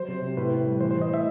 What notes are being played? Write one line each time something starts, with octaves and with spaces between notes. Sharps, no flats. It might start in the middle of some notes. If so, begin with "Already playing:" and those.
Already playing: F#3 C5
C3
C3
A2 B4
A2
G3
E3 C5
E3 C5
D#5
A2 E5